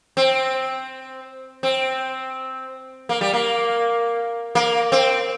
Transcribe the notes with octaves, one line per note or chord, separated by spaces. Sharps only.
C4
C4
A#3
G3
A#3
A#3
C4